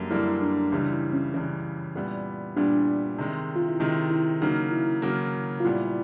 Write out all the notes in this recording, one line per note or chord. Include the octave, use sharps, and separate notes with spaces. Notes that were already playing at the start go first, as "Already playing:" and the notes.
Already playing: F#2 D3 G3 A#3
F#2 D3 G3 A#3 E4
D4
C#2 C#3 E3 G3 E4
E4
C#4
C#2 C#3 E3 G3 C#4
A#2 G3 B3 E4
A#2 G3 B3 D4 E4
C3 D#3 G#3
F4
E4
C3 D#3 G#3 D#4
E4
C#3 F#3 A#3 D#4
E4
E4
C#3 F#3 A#3
F4
A#2 G3 B3 E4